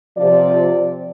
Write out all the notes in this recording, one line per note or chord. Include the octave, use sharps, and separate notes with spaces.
C3 F3 D5